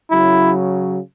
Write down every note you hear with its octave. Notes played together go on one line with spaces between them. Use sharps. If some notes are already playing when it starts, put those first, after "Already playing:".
C#3 F#3 E4